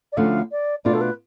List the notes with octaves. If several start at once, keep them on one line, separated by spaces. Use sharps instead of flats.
D5
D2 D3 F3 A3 C#4 F5
D5
B2 A3 D4 F4 D5
A4
B4